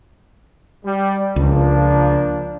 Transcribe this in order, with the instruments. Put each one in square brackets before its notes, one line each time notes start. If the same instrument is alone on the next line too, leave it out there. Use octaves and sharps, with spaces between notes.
[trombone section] G3
[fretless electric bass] C#2 [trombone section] F3 A#3 D4